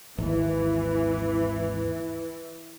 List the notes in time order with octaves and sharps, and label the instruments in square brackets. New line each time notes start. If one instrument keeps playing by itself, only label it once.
[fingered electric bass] G#1 D#2 [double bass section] E3